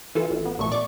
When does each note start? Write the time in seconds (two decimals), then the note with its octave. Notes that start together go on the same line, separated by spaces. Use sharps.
0.15 E3 F4 A4
0.30 A1
0.45 B3
0.58 A#1 A#2 A3 C#6
0.72 D5 C#6 D6